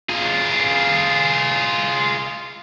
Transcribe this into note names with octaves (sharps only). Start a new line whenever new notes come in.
F4 G#4